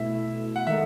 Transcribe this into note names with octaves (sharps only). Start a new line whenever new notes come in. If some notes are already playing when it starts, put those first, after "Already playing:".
Already playing: B2 A3 E4 E5
F#5
D#3 G#3 D#4 A4 E5